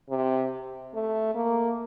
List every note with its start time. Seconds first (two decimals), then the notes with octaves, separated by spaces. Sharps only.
0.10 C3
0.94 A3
1.35 A#3